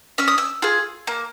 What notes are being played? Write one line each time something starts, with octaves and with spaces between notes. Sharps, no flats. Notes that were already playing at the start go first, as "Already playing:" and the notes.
C#4 E6
D#6
E6
F4 G#4
A#3